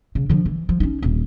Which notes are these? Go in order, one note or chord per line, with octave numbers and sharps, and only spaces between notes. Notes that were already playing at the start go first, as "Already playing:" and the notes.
C#3
D3 F3
E3
F3
C#4 D#4
D#1